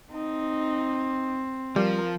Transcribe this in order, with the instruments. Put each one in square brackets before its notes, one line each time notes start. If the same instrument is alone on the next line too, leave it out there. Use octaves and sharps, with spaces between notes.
[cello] C4 [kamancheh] D#4
[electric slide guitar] F3 [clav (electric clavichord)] G3 [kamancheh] A#4